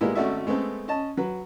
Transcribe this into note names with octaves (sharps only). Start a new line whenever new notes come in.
A#2 G3 G#3 A#3 B3 E4
G#1 A3 C#4 F#4 D5 E5
G#3 A3 B3 C4 A4
C#4 D#5 A5
F#3 B4